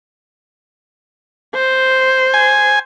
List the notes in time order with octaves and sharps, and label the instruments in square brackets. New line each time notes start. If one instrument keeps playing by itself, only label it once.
[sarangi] C5
[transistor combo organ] G#5